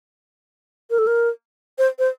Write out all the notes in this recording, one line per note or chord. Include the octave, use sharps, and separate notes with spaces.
A#4
A4
A#4
C5
C5